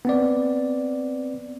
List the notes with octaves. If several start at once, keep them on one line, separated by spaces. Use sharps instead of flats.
B3 C4 D5